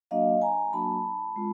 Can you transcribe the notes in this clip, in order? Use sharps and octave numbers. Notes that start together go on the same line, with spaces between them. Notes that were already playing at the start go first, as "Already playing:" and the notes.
F#3 A#3 D4 F#4 D#5 F5
G#5 A#5
F#3 A#3 D4 F#4 A5 B5
G#3 C4 F4